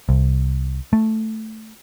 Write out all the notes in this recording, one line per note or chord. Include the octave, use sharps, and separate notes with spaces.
C2
A3